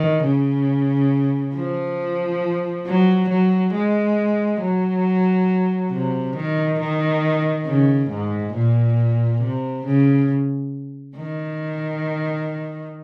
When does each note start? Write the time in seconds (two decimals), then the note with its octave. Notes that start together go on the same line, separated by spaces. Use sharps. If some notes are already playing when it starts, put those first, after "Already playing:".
Already playing: D#3
0.24 C#3
1.55 F3
2.87 F#3
3.30 F#3
3.74 G#3
4.61 F#3
5.92 C3
6.36 D#3
6.80 D#3
7.66 C#3
8.11 G#2
8.54 A#2
9.42 C3
9.85 C#3
11.17 D#3